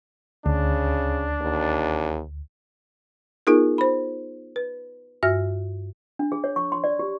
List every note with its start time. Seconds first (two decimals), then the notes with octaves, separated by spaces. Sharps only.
0.46 D2 C#3 D4
1.41 D#2
3.47 B3 D#4 F4 G#4 A#4
3.78 C5 B5
4.56 B4
5.23 G2 F#4 E5 F6 A#6
6.19 D4
6.32 G#4
6.44 C#5
6.56 C#6
6.72 C6
6.84 D5
6.99 G4